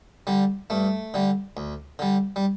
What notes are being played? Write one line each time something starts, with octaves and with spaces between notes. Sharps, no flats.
D3 G3
G2 A3
D3 G3
D2
D3 G3
G3